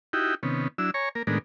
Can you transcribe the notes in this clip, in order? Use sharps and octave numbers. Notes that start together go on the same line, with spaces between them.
D#4 E4 F#4 G4 G5
C3 D#3 B3 C#4
F#3 D4 E4 E6
C#5 G#5 A#5 C#6
A#3 A#4
A2 D#3 G#3 B3 D4 A#4